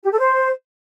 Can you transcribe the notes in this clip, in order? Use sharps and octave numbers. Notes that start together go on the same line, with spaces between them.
G4
A4
C5